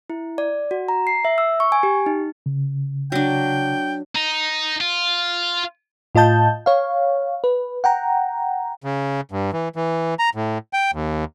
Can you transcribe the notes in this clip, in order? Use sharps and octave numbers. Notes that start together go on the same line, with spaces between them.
E4
D5
F#4
A#5
C7
E5
E6
C#6
G#5
G4
D#4
C#3
F#3 D4 G5
D#4
F4
A2 F4 D#5 A5 G6
C#5 F5
B4
F#5 G5 A#5
C#3
G2
E3
E3
A#5
A2
G5
D#2